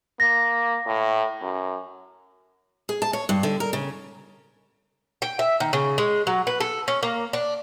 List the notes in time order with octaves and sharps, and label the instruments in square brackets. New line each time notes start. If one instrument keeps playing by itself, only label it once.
[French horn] A#3 [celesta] A#6
[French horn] A2
F#2
[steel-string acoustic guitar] G#4
A5
C#5
G2
D3
A#4
C#3
[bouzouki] G5
E5
D#3
C#3
G#3
F#3
B4
A4
C#4
A#3
D4